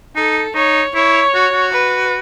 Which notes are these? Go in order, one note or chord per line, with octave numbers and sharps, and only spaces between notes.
D#4 A4
D#4 C#5
E4 C#5
F#4
F#4
B4